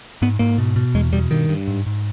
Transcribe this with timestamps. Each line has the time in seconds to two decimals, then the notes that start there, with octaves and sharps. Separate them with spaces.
0.22 G#2 B3
0.39 G#2 A#3
0.58 B2
0.76 B2
0.95 E2 G#3
1.13 B2 G3
1.31 G2 D#3
1.49 G2
1.68 G#2
1.86 G#2